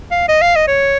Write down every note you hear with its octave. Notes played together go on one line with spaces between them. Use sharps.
F5
D#5
F5
D#5
C#5